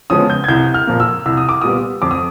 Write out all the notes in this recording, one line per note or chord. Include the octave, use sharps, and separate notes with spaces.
C#3 F3 G#3 B3 D#6
G6
G#6
C2 G6
F6
A#2 F3 A#3
E6
C2 E6
D#6
D6
A#2 G3 B3 D#6
F2 D6
D#6